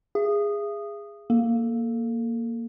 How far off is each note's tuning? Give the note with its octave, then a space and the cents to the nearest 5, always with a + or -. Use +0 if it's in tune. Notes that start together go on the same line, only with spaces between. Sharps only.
G#4 -15 E5 +40
A#3 +0 A4 +0